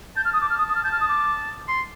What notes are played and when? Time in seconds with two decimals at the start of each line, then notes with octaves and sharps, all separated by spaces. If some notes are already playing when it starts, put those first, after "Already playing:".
0.16 A5 G6
0.25 F6
0.33 D#6
0.42 D6
0.50 F6
0.58 D#6
0.69 D#6
0.75 F6
0.84 A5 G6
0.92 F6
1.01 D#6
1.09 D6
1.68 C6